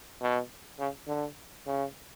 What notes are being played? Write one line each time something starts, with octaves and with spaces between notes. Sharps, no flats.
B2
C#3
D3
C#3